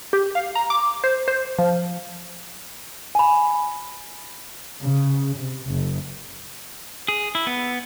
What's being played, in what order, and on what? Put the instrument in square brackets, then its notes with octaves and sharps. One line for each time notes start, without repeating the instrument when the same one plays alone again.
[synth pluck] G4
F5
A#5
D6
C5
C5
F3
[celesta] G#5 B5
[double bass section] C#3
C3
F#1
[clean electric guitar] G#4
E4
B3